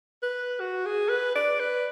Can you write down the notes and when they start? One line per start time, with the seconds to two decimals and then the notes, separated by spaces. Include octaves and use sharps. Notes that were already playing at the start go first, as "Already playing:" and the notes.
0.23 B4
0.60 F#4
0.86 G#4
1.09 B4
1.35 D5
1.60 B4